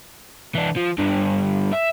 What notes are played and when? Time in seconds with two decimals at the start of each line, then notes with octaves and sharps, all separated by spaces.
0.55 E3 D4
0.76 F3
0.99 G2 D3
1.73 E5